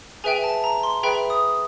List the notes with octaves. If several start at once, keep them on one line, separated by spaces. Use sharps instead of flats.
G#4 B4 E5 G5 G#5
A5
A#5
C6
G#4 B4 E5 G5 B5
D#6